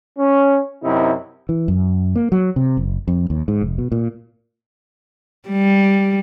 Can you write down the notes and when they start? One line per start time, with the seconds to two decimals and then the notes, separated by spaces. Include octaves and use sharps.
0.19 C#4
0.84 F#2 C3 D#4 E4
1.49 E3
1.68 F#2
2.16 A#3
2.32 F#3
2.56 C3
2.77 F#1
3.08 F2
3.30 D#2
3.48 G#2
3.62 F1
3.78 B2
3.92 A#2
5.49 G3